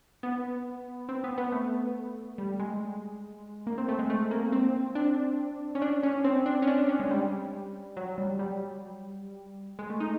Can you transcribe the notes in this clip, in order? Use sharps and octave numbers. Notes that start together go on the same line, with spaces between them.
B3
C4
B3
B3
A3
G3
G#3
A#3
C4
A3
G#3
A3
A#3
C4
D4
C#4
D4
C#4
C4
D4
C#4
D4
D4
C#4
G#3
G3
F#3
G3
G3
G#3
A3
D#4